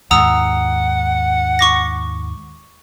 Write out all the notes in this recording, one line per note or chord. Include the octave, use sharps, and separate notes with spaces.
D#2 G#2 F#5 A#5 D#6 E6
C#6 D6 A#6